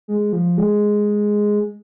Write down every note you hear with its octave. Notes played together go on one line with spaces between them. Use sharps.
G#3
F3
G#3